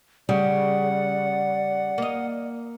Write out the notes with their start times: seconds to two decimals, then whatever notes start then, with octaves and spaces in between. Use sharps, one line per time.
0.29 C#3 G3 D5 F#5
1.98 A#3 D#5